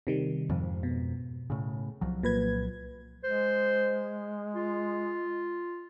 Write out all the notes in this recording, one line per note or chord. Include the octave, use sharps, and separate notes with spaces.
C3 D#3 G3
F2 G#2 F3
B2
A2 C#3
C2 F3 F#3
A#2 B4 G#6
G#3 C5
F4